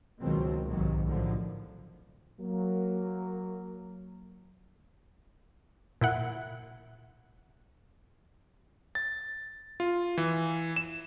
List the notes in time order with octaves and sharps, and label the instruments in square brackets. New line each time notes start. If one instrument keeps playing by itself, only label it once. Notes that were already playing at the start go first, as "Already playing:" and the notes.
[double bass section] C#2 B2 D#3 F#3 A#3 C4
B1 G#2 C3 D#3 F#3
A2 D3 D#3 F3
[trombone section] F#3 A#3
[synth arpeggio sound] A#2 E4 F#5
[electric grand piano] A6
F4
E3
E7